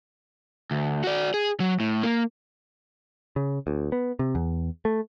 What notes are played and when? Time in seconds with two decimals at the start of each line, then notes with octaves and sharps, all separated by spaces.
0.71 D2
1.04 F#4 D5
1.34 G#4
1.60 F#3
1.80 A2
2.03 A#3
3.36 C#3
3.67 D2
3.92 B3
4.19 C3
4.35 E2
4.85 A3